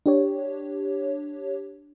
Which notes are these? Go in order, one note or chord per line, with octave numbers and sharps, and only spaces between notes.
D4 G4 C#5